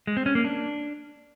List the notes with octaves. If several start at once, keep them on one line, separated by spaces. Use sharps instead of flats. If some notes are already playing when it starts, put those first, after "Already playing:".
G#3
C4
C#4
A#3
D4